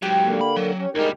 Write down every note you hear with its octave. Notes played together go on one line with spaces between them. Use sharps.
G#2 F#3 G4
D3 A#3
B5
F#3
C#4
D2 G3 G#3 D#4 A#4